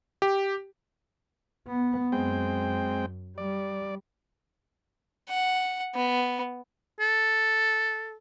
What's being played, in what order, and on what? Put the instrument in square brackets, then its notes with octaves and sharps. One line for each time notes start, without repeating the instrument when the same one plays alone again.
[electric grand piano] G4
[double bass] B3
[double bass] F#2 [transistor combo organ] G#3 C4 G5
[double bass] G3 [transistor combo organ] D5
[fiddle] F#5
B3
[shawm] A4